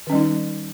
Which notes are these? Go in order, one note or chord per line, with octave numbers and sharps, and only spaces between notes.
D#3 G3 C#4 D#4